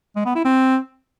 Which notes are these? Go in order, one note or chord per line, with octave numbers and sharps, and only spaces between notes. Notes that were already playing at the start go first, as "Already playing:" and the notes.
G#3
B3
E4
C4